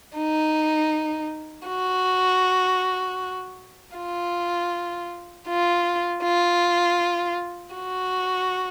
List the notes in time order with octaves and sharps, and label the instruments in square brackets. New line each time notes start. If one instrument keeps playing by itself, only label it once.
[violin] D#4
F#4
F4
F4
F4
F#4